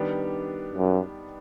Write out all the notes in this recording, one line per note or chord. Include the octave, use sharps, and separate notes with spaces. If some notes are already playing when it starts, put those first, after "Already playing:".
Already playing: D#3 G3 B3 D4 G4
F#2